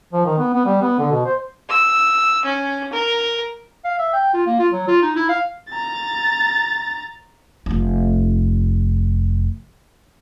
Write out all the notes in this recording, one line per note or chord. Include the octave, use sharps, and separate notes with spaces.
F3
D#3
B3
B3
G3
B3
D3
B2
C5
E6
C#4
A#4
F5
E5
G5
F4
A#3
F4
F#3
F4
D#4
E4
F5
A#5 A6
F1 F4